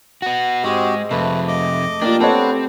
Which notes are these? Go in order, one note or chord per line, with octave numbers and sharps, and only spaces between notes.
B3 F#4
G#2 G#3 C4 F#4 G4
F2 C3 A3 B4
D#5 D6
A#3 D4 F4 G4 D5
B3 C4 D4 A4 B4 C#5